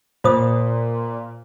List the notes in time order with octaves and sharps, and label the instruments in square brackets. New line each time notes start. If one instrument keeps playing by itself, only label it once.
[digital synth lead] A#2 [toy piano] F4 C5 D#6